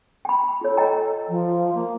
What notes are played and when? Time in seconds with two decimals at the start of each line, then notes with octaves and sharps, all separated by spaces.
0.25 G5 B5
0.61 F4 A4 C#5
0.77 D#5 G5 A#5
1.29 F3
1.74 A#3